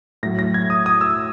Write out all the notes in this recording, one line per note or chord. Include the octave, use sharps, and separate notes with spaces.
A2 F#3 A#6
A#6
G#6
D#6
D#6
E6